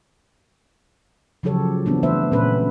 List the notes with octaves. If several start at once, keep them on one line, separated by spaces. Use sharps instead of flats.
C#3 F3 F#3 G4 A4 C#5
E3 B3 C4 D4
A3 B4 C5 E5
A#2 C4 C#4 A4 B4